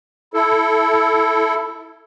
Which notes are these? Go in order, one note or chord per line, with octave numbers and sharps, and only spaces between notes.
E4 A4